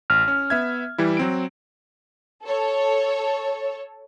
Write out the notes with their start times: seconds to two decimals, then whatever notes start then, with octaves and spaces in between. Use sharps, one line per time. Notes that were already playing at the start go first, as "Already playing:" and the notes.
0.10 A1 F6
0.28 C#4
0.50 B3 E5 G#6
0.98 E3 G3 E4
1.17 F#3 C4 D7
2.44 A4 C#5